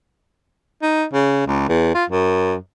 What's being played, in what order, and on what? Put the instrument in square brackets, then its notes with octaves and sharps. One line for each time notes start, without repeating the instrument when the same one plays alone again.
[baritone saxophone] D#4
C#3
C#2
E2
F4
F#2